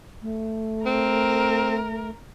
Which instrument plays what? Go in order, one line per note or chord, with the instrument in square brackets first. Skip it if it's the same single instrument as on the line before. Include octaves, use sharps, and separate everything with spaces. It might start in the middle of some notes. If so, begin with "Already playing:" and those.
[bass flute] A3
[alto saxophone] C4 [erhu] A#4